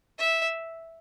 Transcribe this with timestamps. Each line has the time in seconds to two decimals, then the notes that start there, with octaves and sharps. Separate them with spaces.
0.19 E5